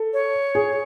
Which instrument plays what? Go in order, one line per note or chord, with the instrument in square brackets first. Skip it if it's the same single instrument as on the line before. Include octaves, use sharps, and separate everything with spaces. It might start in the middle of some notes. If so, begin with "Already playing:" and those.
Already playing: [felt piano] A4
[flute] C#5
[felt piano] G#4